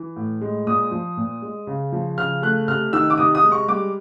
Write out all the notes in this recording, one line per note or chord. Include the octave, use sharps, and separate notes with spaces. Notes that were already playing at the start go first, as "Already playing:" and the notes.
Already playing: E3
A2
G#3
A#2 D#6
F3
A#2
G#3
C#3
F3
C#3 F6
A3 F#6
C3 F6
D#3 E6
D6
C3 D#6
D#6
G#3
C#6
G3 D6